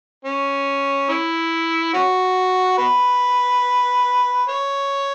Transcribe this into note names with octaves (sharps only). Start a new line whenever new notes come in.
C#4
C#4 E4
C#4 F#4
F#4 B4
C#5